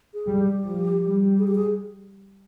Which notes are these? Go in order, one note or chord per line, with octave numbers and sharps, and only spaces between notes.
G#4
G3
G4
F3
G3
G#4
G4
G#4